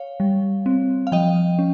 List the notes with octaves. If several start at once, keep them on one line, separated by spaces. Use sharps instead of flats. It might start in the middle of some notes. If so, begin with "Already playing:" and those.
Already playing: C#5 F5
G3
C4
F5
F3 D#5 G5
C#4